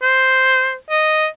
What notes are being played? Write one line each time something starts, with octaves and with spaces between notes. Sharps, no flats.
C5
D#5